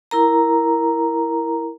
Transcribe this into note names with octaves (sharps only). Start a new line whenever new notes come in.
E4 A#4 A#5